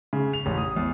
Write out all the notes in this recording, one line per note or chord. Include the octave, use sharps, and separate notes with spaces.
C#3
F7
A1
D#6
E2